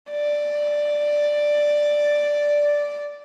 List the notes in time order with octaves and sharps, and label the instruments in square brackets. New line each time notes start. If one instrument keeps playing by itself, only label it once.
[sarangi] D5